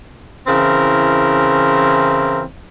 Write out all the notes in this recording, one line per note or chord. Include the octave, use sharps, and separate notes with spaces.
C#3 E3 C4 E4 A#4